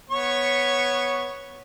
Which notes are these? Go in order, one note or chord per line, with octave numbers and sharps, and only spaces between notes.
B3 C#5 C#6